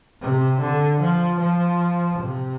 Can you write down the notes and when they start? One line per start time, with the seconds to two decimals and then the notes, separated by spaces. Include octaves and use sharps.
0.21 C3
0.61 D3
1.01 F3
1.40 F3
2.19 C3